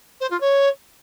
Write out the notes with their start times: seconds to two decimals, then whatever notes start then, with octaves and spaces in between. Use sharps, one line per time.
0.20 C5
0.30 F4
0.40 C#5